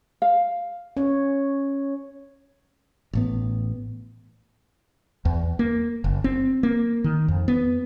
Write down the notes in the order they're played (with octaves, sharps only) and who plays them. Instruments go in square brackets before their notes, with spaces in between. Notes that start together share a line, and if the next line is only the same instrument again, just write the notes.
[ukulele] F5
[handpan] C#4 C#5
[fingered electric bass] A1 A2 B3
[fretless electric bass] E2
A#3
F#1
C4
A#3
D#3
F2
B3